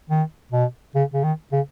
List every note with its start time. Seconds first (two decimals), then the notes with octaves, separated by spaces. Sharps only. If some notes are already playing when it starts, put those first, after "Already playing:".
0.10 D#3
0.52 B2
0.95 C#3
1.14 C#3
1.23 D#3
1.52 C#3